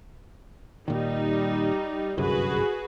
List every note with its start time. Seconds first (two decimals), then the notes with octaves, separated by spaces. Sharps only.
0.88 A#2 D#3 G3 D#4
2.18 G1 C2 F#2 F#4 G#4 B4